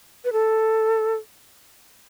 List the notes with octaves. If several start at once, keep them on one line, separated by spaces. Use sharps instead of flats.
B4
A4